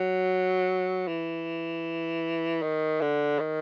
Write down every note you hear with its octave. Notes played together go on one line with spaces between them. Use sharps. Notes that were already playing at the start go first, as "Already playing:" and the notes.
Already playing: F#3
E3
D#3
D3
D#3